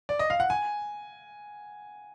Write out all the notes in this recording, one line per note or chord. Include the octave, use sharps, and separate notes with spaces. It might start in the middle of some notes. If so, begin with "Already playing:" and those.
D5
D#5
F5
F#5
G#5